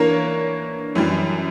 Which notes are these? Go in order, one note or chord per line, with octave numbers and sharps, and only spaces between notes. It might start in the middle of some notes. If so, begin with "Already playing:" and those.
Already playing: E3 A#3 D4 A#4 C#5
F#2 E3 G3